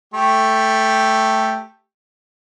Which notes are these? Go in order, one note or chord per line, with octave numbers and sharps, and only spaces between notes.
A3 G4